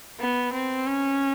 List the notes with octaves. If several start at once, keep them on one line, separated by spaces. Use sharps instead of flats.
B3
C4
C#4